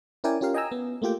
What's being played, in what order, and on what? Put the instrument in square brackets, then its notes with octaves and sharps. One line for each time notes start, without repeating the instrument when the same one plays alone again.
[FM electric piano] C#4 E4 A#4 D5 G5 G#5
C#4 F4 G4 A#4 F5
D#5 G5 G#5 A#5 E6
B3
A3 A#3 F4 G4 G5